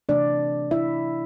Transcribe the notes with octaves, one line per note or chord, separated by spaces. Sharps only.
C3 E3 A3 D4 D5
E4 E5